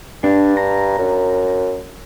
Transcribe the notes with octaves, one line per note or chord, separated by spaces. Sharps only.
G2 D4
A#5
F#2